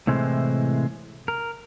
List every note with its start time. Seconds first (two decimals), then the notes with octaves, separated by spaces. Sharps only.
0.07 A2 C3 E3 G#3 C5
1.28 A#4